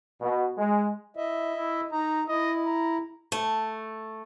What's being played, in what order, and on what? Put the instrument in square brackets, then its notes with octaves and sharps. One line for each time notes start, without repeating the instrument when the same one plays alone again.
[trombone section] B2
G#3
[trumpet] E4 [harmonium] D#5 E5
[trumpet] E4
[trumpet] D#4 [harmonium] A#5
[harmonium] E4 [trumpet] D#5
[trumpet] A#5
[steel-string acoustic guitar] A3